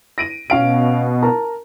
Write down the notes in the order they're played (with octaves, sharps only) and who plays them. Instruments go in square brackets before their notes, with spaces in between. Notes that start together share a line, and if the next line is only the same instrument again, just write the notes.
[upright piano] A#6 D7 D#7
[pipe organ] B2 [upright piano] C#4 F5 D7
[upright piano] A#4 A5 A#5